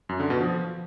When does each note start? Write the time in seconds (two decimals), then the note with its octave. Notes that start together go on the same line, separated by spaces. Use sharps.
0.09 F#2
0.20 D3
0.30 B2
0.40 F3